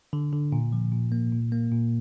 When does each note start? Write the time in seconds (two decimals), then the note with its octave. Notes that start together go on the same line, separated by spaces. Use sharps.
0.13 D3
0.33 D3
0.52 A#2
0.73 F3
0.92 A#2
1.12 A#3
1.32 A#2
1.52 A#3
1.71 A#2